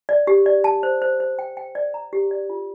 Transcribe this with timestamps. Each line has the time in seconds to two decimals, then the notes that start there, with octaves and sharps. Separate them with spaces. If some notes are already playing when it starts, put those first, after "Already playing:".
0.09 D5
0.27 G4
0.46 D5
0.64 A5
0.83 C5
1.02 C5
1.20 C5
1.39 G5
1.57 G5
1.75 D5
1.94 A#5
2.13 G4
2.31 D5
2.50 F4